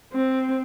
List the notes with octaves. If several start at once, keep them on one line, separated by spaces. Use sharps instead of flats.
C4